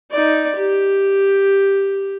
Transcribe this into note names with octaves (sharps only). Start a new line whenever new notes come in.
D#4 D5
G4